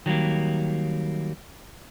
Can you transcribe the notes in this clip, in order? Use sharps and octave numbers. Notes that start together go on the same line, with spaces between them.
D#3 F#3 G3 A#3